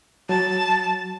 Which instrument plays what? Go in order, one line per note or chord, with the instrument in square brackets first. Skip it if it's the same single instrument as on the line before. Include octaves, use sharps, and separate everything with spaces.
[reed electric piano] F#3 [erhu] A5